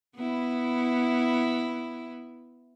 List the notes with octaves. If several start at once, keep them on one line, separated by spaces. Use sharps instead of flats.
B3 E4